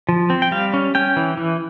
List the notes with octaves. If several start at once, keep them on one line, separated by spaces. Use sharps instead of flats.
F3
C4
G5
G3 F5
C#4
C#4 G5
E3
E3